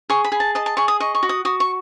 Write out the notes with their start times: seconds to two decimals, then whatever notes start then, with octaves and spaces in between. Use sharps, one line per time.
0.10 G#4 C#6
0.24 B5
0.32 G#4
0.40 A5
0.55 D#5 A5
0.66 A5
0.77 G#4 C#6
0.88 D#6
1.00 D#5 C#6
1.15 C#6
1.23 F#4
1.29 D#6
1.45 F#4 D#6
1.60 C#6